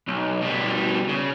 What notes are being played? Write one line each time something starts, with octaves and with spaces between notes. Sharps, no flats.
B1
B2 G3
C#3